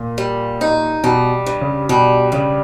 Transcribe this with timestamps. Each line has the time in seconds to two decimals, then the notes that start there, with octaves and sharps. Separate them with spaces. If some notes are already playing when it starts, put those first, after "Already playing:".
Already playing: A#2
0.18 G3
0.61 D#4
1.04 B2 G3
1.46 G2
1.61 C#3
1.89 B2 G3
2.32 G2 C#3